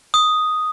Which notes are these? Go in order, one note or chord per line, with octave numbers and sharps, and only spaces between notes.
D#6